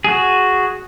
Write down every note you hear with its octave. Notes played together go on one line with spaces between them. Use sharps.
F#4 G#4